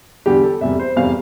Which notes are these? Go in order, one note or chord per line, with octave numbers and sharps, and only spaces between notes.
E2 D3 G3 G4
A4
F1 E2 C3 G3 E5
C5
F1 E2 C3 G3 F5